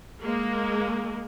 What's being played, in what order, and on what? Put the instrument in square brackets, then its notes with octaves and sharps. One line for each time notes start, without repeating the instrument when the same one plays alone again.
[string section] G#3 A#3